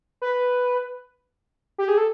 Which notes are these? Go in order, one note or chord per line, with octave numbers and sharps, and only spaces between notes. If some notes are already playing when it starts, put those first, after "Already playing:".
B4
G4
G#4
A4